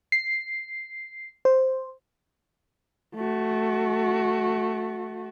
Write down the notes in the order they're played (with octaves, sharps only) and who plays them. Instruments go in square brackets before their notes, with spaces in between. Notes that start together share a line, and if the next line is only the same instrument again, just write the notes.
[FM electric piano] C7
C5
[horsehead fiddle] A3 F#4